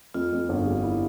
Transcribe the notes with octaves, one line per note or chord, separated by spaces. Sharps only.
F2 F4
F2
G1
G3
E4